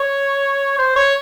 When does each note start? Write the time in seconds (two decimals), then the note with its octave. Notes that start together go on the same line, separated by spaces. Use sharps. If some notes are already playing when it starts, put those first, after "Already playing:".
Already playing: C#5
0.78 C5
0.96 C#5